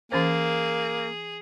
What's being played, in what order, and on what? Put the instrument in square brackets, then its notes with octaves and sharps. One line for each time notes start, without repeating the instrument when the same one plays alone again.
[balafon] E3 C#4 C5 [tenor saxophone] A#3 [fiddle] G#4